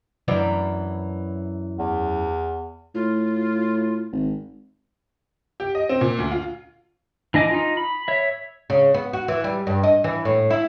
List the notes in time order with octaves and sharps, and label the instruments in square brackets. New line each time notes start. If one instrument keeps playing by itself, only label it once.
[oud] F#2 E3 D4
[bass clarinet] E2
[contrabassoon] A2 [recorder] F4
[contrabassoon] G#1
[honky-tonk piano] G4
D#5
C4
A#2
D2
F4
[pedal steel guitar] E3 D4 D#5 G#5 D6
D#4 F4
B5
C#5 E5
[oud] C#3
B3
F#4
E3
G3
G2
D#5
E3
A2
E4